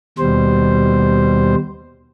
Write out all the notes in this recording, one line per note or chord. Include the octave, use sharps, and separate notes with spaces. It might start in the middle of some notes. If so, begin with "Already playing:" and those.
D#2 B2 G3 C5